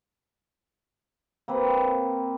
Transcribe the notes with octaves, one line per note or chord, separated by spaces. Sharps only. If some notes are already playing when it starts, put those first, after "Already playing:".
A#3 C4 B4